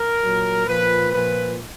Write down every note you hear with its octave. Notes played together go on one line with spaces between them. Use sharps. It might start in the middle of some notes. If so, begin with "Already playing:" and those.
Already playing: A#4
A#2 F#3
A#2 F3 B4
A#2 F3 B4